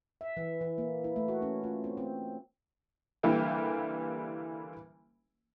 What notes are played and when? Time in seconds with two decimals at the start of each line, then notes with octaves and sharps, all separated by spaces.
0.21 E5
0.37 E3
0.61 E3
0.78 A#3
1.04 E4
1.16 A3
1.28 F#4
1.42 C#4
1.64 F4
1.84 C4
1.97 C4
3.23 F#1 D3 E3 G3 A#3 G5